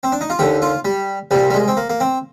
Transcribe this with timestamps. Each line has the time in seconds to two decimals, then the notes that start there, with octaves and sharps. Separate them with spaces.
0.03 C4
0.12 D4
0.21 D#4
0.30 F4
0.39 D#2 D3 G4
0.62 F4
0.85 G3
1.31 C2 A#2 G3
1.50 G3
1.54 G#3
1.68 C4
1.77 A#3
1.90 A#3
2.00 C4